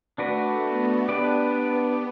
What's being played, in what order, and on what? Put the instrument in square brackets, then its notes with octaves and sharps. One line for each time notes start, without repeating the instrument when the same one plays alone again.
[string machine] A3 [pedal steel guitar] D4 F#4 B4 D5
[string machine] B3
[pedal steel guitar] D4 G4 B4 D5
[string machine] B3